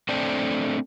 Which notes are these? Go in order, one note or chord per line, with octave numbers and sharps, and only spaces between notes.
A3 C4 D4 A4 C5 D5